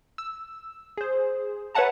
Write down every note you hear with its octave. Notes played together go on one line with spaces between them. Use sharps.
E6
G#4 C5
B4 C#5 E5 F#5 A5 A#5